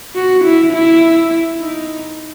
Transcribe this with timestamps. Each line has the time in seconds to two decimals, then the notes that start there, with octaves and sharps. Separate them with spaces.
0.15 F#4
0.45 E4
0.73 E4
1.61 D#4